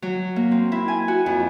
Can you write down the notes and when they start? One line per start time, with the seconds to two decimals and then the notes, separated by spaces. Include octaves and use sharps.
0.02 F#3
0.36 A#3
0.52 C4
0.72 E4
0.88 G#5
1.08 F#4
1.26 F2